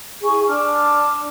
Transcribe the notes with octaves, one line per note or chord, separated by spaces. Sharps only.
E4 G#4 G#5 C#6
D4 A5 D6 F6